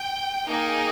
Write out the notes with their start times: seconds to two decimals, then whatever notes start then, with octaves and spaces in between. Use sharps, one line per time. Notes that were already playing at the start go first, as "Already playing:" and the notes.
Already playing: G5
0.47 A#3 D#4 G#4